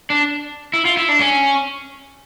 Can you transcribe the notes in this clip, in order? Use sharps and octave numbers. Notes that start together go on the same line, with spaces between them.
D4
E4
F4
E4
D4
C#4